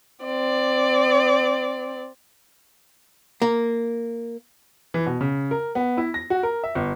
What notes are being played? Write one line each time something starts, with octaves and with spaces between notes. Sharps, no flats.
C4 D5
A#3
E3
B2
C#3
A#4
B3
E4
A#6
F#4
A#4
E5
G1